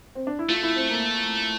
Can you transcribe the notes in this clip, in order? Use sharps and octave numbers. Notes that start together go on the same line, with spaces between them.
C4
D4
E4
A3 F4
E4
C4
A#3